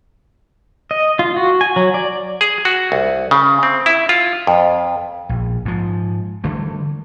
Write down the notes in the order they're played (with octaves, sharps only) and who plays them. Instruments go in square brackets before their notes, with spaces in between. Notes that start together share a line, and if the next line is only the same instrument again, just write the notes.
[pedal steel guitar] D#5
F4
F#4
G#5
F#3
D5
[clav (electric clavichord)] G#4
F#4
C2
C#3
C4
E4
F4
F2
[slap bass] A#1
G#2 F3
D3 E3 G3 A3